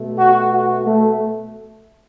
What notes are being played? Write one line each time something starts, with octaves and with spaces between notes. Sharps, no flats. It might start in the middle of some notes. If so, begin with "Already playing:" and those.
Already playing: B2 A3
F#4
F#4
A3